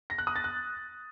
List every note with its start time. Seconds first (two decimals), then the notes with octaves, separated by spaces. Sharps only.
0.10 A#6
0.18 F#6
0.27 D#6
0.36 A6
0.44 F#6